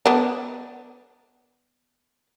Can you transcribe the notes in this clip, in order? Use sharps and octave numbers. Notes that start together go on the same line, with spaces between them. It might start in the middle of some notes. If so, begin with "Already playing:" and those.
B3 D4